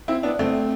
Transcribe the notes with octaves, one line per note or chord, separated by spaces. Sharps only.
C4 E4
B3 D4
A3 C4